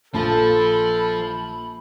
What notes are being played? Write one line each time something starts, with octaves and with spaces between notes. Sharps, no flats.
A#1 F3 A4 B5